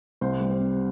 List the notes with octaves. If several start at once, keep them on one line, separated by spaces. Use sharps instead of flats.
C2 C5
G3
C5
C3